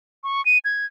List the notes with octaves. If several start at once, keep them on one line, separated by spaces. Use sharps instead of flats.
C#6
D#7
G#6